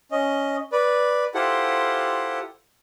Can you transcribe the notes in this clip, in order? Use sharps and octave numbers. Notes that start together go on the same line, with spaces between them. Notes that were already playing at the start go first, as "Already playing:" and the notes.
C#4 D#5
B4 D5
E4 F4 G4 A4 C5 F#5